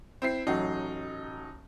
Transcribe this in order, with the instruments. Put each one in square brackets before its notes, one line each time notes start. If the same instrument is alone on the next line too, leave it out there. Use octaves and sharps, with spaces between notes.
[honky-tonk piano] C4 E4 C7
[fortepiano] A1 F#3 [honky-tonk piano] D#4